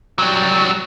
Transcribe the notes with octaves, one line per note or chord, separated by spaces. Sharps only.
F#3 G3